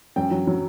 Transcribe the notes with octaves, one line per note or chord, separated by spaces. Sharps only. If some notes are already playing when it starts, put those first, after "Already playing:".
F#2 G5
F#3
F#3